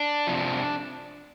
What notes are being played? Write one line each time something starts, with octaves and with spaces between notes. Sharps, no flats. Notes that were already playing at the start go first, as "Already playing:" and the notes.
Already playing: D4
F2 C3 F3